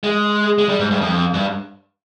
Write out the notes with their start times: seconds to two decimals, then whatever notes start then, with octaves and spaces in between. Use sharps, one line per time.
0.04 G#3
0.58 G#3
0.69 G3
0.79 G#2
0.91 G2
1.01 F2
1.34 G2